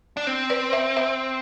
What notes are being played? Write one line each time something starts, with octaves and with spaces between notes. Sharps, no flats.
D4
C4
B4 D5
C5 E5
C5 E5